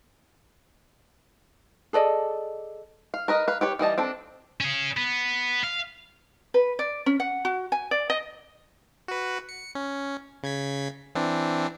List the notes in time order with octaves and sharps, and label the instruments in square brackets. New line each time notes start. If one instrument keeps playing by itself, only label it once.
[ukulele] G#4 A4 D5 D#5
[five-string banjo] F5
A#4 B4 D#5
B4 F5
G4 B4 C#5
E3 G3 D#5 A5
C4 D4 A4
[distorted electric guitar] C#4 G#4
B3
F5
[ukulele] B4
D5
C#4
F#5
F#4
G#5
D5
D#5
[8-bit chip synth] F#4 B4
C#7
C#4
C#3 G#6 B6
E3 C4 D4